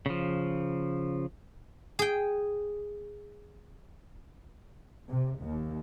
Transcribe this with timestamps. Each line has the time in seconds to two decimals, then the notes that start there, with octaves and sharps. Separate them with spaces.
0.06 C#3 F3
1.99 G#4 G5
5.11 C3
5.42 D#2